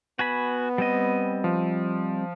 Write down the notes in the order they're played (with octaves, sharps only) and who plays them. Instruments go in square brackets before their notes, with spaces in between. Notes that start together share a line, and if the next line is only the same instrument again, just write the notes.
[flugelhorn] B3 [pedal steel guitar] F#4 G#5 B5
[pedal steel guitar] G3 C4 D#5
[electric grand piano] F3